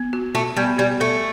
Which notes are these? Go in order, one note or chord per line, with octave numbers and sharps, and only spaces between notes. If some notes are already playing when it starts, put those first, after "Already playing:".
Already playing: B3
F#4
A3 F#4
G3 B3
G3 B3
A3 A4